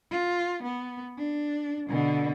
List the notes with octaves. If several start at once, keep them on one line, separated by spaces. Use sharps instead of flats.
F4
B3
D4
B2 D3